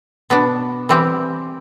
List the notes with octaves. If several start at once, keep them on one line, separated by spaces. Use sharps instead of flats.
B2 B3 D4
E3 G3 C4 G4